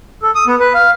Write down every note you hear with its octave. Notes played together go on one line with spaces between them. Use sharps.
A4
D#6
B3
B4
F5